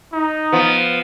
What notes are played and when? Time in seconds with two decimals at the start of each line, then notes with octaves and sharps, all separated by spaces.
0.13 D#4
0.52 F3 B3